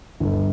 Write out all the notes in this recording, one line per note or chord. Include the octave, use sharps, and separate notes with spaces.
G1